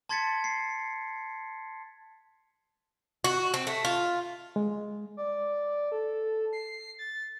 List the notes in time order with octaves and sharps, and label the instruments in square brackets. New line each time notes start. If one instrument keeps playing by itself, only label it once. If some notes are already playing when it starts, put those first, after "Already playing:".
[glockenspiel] A5 C6 G#6 A6 B6 C#7
C7
[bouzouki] F#4
C4
A3
F4
[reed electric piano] G#3
[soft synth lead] D5
A4
C7
A6